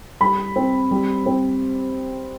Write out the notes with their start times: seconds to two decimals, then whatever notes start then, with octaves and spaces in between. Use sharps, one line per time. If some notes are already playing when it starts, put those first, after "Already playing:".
0.21 G3 B5
0.56 C4
0.91 G3
1.26 C4